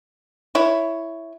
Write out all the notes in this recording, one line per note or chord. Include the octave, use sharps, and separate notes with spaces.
E4 C#5